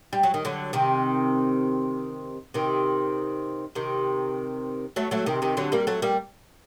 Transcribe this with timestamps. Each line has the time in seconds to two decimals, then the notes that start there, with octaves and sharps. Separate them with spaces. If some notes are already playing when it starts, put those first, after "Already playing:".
0.13 G3
0.23 F#3
0.34 D#3
0.45 D3 F#3
0.73 C3 D#3
2.54 C3 D#3
3.75 C3 D#3
4.96 F#3 A3
5.11 F#3 A3
5.26 C3 D#3
5.42 C3 D#3
5.57 D3 F#3
5.72 G3 A#3
5.87 F#3 A3
6.02 G3 A#3